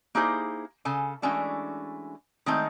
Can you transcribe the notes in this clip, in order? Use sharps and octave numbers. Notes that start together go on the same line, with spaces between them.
A#3 D#4 E4 G4 G#4 C5
C#3 A4 G#5
E3 G#3 A3 C#4 D4 F#4
D#3 G#3 A3 C4 D#4